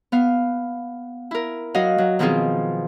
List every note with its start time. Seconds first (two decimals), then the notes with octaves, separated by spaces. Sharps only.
0.12 B3 F5
1.31 E4 A#4
1.74 F#3 F#4 D#5 F5
1.98 F#3
2.19 B2 D#3 F3 C4 F4 G#4